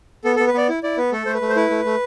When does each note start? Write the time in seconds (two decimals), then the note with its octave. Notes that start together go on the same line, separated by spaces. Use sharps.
0.24 B3 A4
0.36 B3 A4
0.47 B4
0.54 B3 D5
0.69 E4
0.83 E4 D5
0.97 B3 B4
1.12 A3 A4
1.26 A3 C5
1.34 B4
1.41 A3
1.49 C5
1.56 E4 B4
1.70 A3
1.85 A3